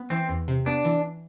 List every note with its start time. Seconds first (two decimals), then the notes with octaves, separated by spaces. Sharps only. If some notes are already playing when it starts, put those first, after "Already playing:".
Already playing: B3
0.10 E3 C4
0.29 E2
0.48 C3
0.66 B3 D4
0.85 E3